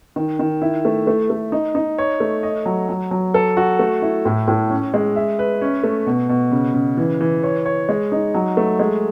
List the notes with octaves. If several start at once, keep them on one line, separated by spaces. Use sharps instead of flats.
D#3
D#3
E4
A3
A3
A3
D#4
D#4
C#5
A3
D#5
F#3
F#3
F#3
A4
F#4
A3
E4
A2
A2
C#4
G#3
E5
B4
C#4
A3
B2
B2
C#3
C#3
E3
E3
C#5
C#5
G#3
D#4
F#3
A3
G#3